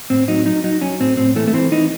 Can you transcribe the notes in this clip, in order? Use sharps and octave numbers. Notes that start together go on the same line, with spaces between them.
A2 C4
F#3 D#4
F#3 D#4
F#3 D#4
F#3 C#4
A2 C4
A2 C4
E3 A3
A3
E3 C4
E3 D#4